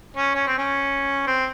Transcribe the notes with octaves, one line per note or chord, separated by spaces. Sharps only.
C#4
C#4
C4
C#4
C4